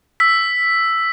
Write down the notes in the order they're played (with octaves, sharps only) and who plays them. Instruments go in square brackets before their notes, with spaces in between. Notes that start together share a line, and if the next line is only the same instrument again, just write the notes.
[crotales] E6 B6